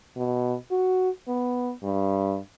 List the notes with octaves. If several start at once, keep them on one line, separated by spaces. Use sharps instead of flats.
B2
F#4
B3
G2